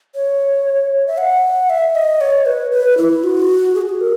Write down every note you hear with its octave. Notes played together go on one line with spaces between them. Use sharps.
C#5
E5
F#5
E5
D#5
C#5
B4
B4
E4
F#4
G#4
F#4
G#4
A#4